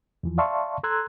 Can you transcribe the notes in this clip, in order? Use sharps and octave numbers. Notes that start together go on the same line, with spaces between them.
E2 E3 F3
D5 E5 F5 A5 C6 C#6
A4 A#5 C6 E6 F#6 G#6